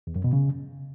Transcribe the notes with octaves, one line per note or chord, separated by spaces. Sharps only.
E2
F#2
B2
C#3